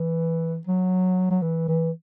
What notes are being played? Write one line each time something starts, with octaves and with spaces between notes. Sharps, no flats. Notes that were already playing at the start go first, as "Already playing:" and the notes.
Already playing: E3
F#3
F#3
E3
E3